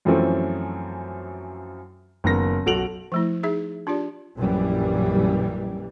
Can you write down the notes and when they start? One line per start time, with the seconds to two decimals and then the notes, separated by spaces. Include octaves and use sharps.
0.05 F#2 E3 F3 A3 C4 C#4
2.24 F#1 D#3 B3 A#4 A#6
2.66 B1 F#4 A4 D7 F7 F#7
3.12 F3 A3 E4
3.43 D#4 G#4 E5
3.87 D4 F4 G4 D5
4.37 A#1 F#2 E3 G3